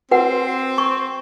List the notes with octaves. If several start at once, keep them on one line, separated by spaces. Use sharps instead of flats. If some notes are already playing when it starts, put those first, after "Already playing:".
C4 F#4 B4 F#5
C#6